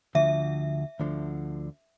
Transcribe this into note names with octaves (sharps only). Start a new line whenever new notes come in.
D2 D3 F3 E5
D2 D3 F3